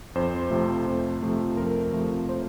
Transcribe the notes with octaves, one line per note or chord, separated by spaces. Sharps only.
F2 C5
C3 F3 A3
F2
C3 F3 A3
F2 A#4
C3 F3 A3
C5